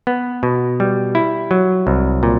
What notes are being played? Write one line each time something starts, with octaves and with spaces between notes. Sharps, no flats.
B3
B2
G3
E4
F#3
C2
A#2